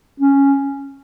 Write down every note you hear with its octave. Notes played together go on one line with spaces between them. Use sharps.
C#4